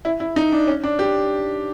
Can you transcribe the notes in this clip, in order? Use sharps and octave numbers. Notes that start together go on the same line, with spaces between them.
E4
E4
D#4
D4
C#4
D4
G4